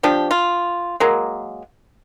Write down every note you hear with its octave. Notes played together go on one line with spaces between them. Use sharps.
F3 D4 G4
F4
F#3 G#3 A#3